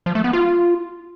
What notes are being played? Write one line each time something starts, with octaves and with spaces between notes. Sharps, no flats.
F3
A3
B3
F4